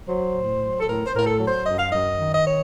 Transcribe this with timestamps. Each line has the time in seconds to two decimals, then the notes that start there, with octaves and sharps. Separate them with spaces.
0.08 F#3 C5
0.35 A2
0.61 F#3
0.80 A4
0.87 A2 A#4
1.06 C5
1.13 A2 A#4
1.26 A4
1.40 F#3
1.46 C5
1.66 F#2 D#5
1.78 F5
1.91 F#2 D#5
2.18 D#3
2.33 D#5
2.44 C#5